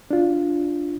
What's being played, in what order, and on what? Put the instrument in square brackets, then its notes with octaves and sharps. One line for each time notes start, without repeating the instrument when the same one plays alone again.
[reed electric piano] D4 F4